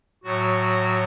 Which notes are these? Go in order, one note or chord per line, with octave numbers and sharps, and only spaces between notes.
A2 F#3 F#4